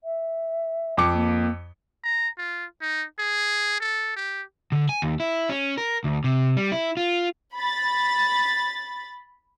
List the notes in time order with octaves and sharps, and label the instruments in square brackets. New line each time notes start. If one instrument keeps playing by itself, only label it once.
[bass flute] E5
[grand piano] F2 D6 C#7
[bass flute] A#3
[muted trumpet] A#5
F4
D#4
G#4
A4
G4
[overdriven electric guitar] D3
G#5
D#2
E4
C#4
A#4
D2
C3
G3
E4
F4
[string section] B5 A6